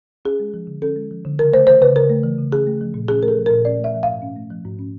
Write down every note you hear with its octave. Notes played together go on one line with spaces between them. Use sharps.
C#4 G#4
G#3
F3
D3
C#4 A4
G#3
F3
D3
C#3 A#4
A3 C5
E3 C5
C#3 B4
C#3 A#4
A3
E3
C#3
C#4 G#4
A3
F3
A#2
C#4 G#4
A3 A#4
A4
F3
A#2 A#4
C#4 D5
A3 E5
F3
F5
G#2
C#4
A3
F3
G#2
C#4